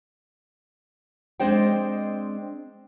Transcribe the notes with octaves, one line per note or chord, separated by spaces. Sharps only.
G#3 C4 D4 C5 D#5 G5